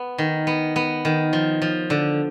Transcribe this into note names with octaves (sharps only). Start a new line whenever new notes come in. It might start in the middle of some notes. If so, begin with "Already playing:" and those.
Already playing: B3
D#3
B3
B3
D#3
F3
F3
D3